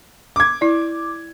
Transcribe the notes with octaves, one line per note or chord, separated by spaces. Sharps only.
D6 G#6
E4 D5